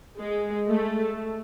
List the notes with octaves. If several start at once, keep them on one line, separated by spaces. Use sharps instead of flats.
G#3
A3